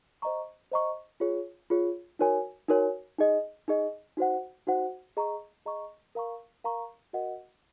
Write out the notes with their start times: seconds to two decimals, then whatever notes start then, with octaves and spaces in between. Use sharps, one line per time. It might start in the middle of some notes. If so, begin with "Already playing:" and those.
0.22 C5 D#5 A#5 C#6
0.72 C5 D#5 A#5 C#6
1.20 F4 G#4 C#5
1.70 F4 G#4 C#5
2.19 D#4 F#4 A#4 C#5 G#5
2.69 D#4 F#4 A#4 C#5 G#5
3.18 D#4 G#4 D#5
3.68 D#4 G#4 D#5
4.17 D#4 F#4 C5 F#5
4.67 D#4 F#4 C5 F#5
5.17 G#4 D#5 A#5 C#6
5.66 G#4 D#5 A#5 C#6
6.15 A#4 F5 A#5 C#6
6.64 A#4 F5 A#5 C#6
7.13 F#4 A#4 D#5 F#5